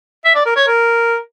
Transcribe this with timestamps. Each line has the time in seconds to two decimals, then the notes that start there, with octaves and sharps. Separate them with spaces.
0.25 E5
0.35 D5
0.46 A#4
0.56 C#5
0.67 A#4